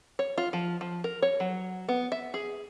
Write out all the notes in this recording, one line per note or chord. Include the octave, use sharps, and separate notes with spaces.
C#5
F4
F3
F3
A#4
C#5
F#3
B3
E5
G#4